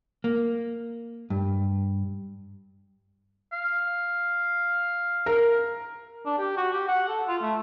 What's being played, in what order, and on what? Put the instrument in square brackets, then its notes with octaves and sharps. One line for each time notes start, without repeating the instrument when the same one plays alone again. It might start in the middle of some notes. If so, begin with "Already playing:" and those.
[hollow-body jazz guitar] A#3
G2
[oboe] F5
[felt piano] A#4
[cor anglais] D4
G4
F#4
G4
F#5
A4
F4
A3